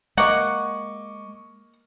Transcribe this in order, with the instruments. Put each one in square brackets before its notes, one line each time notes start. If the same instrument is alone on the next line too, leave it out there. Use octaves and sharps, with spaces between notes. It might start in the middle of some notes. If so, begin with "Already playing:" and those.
[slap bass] G#3 [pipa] A#3 F#5 [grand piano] D#5 C#6 D6